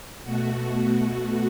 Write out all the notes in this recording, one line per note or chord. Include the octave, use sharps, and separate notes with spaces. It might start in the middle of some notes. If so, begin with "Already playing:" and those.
B2 A3 F#4